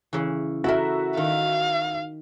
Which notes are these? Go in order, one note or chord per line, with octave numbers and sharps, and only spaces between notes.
C#3 E3
E4 F#4 A4 A#4 E5
D#3 F5